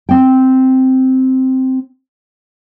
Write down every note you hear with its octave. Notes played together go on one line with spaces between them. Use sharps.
C4 G5